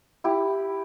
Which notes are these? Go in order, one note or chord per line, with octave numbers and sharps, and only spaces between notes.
E4 G4